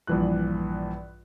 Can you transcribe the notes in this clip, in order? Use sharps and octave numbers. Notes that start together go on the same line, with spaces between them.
A#1 G2 E3 F3 F#6